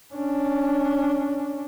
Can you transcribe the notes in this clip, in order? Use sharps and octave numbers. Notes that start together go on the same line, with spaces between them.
C#4 D4